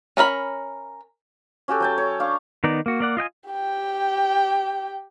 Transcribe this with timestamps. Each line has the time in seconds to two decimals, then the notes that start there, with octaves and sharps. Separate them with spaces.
0.17 C#4 A#4 F5 B5
1.68 C#4 F#4 G4 A4
1.80 F#3 G5 A5
1.98 C#5
2.20 D4 F5 A#5 C#6
2.64 D#3 B3 D#4 D5
2.86 A#3 F#4
3.00 A#3 D5 F#5
3.17 F4 D#5 G5 G#5
3.49 G4 G5